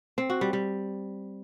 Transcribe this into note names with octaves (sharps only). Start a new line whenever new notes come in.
C4
F#4
G3
G3